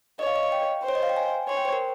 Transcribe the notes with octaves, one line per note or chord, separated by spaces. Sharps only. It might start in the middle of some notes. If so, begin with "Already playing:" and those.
C#5 D#5
F5
D#5
F5
G5
C5
C#5
D#5
F5
G5
G#5
C#5 C6
G5
C5
A#4